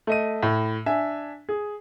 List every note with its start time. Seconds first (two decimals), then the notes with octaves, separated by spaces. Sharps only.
0.07 A3 D#5 D#7
0.43 A2
0.86 D4 E5 G#5
1.49 G#4